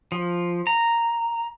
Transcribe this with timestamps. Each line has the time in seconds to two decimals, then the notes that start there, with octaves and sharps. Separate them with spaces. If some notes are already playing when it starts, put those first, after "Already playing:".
0.12 F3
0.67 A#5